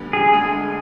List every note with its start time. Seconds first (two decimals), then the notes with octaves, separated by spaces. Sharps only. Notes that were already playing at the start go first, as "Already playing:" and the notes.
Already playing: D2 D3 G3 B3
0.13 G#4
0.34 D2 D3 G#3